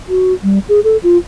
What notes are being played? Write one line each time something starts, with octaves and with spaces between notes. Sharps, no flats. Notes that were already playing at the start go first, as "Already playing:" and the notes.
F#4
G3
G#4
A4
F4